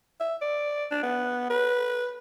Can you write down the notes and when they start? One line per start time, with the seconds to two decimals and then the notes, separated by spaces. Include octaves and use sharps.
0.20 E5
0.42 D5
0.91 D4
1.03 B3
1.50 B4